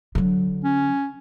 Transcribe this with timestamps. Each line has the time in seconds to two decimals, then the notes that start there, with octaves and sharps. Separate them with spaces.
0.15 D3 F#3
0.64 C#4